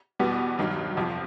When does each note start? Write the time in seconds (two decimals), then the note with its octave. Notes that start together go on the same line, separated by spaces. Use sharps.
0.20 E2 B2 G3 B3
0.58 G2 D#3 F#3
0.97 G1 F2 C3 F3